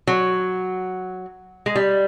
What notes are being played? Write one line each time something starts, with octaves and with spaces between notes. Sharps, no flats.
F#3
G#3
G3